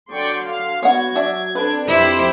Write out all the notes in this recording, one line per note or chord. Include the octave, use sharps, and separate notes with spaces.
D3 F#3 D5 G5 C6 C#6
F5
B3 F#4 C#5 F#5 G#6
F#3 D4 F#4 E5
C4 D4 A4 B4
F2 E4 G4 C5 B5